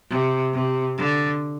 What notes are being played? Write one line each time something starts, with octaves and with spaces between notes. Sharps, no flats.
C3
C3
D3